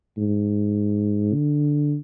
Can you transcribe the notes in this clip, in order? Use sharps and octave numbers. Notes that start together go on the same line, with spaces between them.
G#2
D3